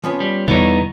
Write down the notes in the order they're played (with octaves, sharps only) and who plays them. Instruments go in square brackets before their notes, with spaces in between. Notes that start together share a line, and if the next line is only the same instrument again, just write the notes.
[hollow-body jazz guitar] F3 B3 C#4
[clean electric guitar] G3
[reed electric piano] E2 E4 [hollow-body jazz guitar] B2 C#5 [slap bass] D3 G3 [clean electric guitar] B3 D#4